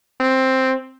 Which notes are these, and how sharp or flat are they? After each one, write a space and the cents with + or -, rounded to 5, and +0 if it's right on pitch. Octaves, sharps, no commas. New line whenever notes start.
C4 +5